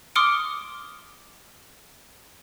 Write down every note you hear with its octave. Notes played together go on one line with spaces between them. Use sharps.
C6 D6 D#6 F6 C#7 D7